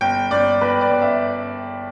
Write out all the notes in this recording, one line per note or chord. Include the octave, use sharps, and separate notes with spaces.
G1 G5
G1 D5
G1 B4
D5
G1
E5